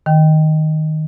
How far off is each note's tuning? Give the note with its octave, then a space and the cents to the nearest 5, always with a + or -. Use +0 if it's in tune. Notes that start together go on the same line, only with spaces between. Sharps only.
D#3 +0 G5 +0